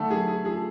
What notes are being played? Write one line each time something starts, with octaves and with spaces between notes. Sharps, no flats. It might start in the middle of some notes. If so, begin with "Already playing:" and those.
Already playing: D3 A3 A4
F#2 G#4
F#2 G#4
F3 G#4